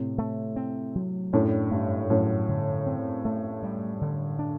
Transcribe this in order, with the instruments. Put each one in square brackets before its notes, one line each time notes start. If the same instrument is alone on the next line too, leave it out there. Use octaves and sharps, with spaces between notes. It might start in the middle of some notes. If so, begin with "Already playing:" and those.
Already playing: [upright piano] A2 C3 [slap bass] C4
[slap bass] A3
C4
F#3
[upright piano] F#2 A2 [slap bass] D4
[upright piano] G2 [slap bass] A3
[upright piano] F#2 A2 [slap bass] F#3
[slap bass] D3
C4
A3
G3
D3
D4